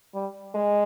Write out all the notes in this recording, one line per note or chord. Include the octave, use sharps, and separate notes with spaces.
G3
G#3